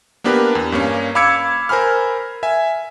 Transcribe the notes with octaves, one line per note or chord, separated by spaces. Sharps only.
A#3 B3 D4 G4 A#4 B4
E2
G2 A#3 C#4
F5 B5 D6 E6 G#6 C#7
A#4 C5 G#5 B5 F6
E5 G#5